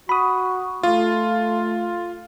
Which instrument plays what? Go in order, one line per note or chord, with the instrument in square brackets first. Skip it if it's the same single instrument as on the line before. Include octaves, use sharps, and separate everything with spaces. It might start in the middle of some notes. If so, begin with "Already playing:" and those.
[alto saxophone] F#4 [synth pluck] B5 D#6 [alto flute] C#6
[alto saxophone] A3 [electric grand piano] F4 [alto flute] F5